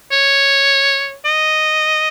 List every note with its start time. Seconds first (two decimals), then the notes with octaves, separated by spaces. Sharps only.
0.12 C#5
1.25 D#5